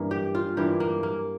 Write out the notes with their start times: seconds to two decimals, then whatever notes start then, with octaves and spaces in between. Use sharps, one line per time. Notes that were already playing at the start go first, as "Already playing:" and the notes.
Already playing: G2 E3 A#3
0.11 G4
0.35 F4
0.57 G2 E3 A#3 G4
0.80 A#3
1.03 A#3